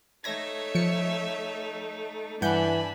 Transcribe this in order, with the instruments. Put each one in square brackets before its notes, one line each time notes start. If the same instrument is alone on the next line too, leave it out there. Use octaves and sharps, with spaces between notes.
[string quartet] A3 D#4 A4 [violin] C#5 E5 [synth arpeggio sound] G#6 A#6
[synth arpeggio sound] F3 C#7
[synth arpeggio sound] G2 F#5 G6 [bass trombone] E3 [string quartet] D4 A5 B5 [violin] G#5